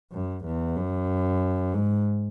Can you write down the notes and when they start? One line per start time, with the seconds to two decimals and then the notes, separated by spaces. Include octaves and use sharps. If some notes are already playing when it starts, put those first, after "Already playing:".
0.13 F#2
0.45 E2
0.77 F#2
1.74 G#2